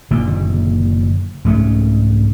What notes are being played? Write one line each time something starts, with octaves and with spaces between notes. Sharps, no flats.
F#1 A#2 D3 D#3
C2 G#2 A3 C#4